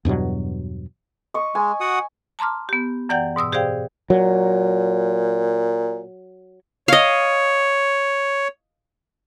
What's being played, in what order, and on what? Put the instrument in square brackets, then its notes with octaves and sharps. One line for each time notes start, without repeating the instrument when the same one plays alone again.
[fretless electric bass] E2 G2 B2 F#3
[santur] D#5 C#6
[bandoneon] G#3 [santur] G#5
[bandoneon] F#4 F#5 D#6
[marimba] A5 A#5 C6 D6 F6
B3 G4
F#2 E3 D5 F#5 G5 G6
G#2 B2 D#6 E6
G4 G#4 C5 D5 F5 G5
[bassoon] A#2 [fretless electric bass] F#3
[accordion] C#5 [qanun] D#5 F5